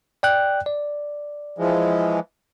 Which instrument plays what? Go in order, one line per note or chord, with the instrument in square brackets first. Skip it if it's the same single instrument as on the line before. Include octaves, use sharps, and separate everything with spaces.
[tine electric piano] D5 G5 F#6
D5
[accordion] E3 F3 G#3